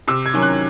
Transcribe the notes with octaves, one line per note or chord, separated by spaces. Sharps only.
C3 E6
G#6
D#3 F#3 C#4
F#6